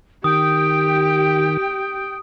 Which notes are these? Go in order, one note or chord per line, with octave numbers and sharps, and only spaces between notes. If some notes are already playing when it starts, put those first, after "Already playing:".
D#3 G4 G5 D#6